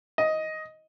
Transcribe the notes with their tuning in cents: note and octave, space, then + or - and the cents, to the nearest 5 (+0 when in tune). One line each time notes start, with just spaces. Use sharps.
D#5 +10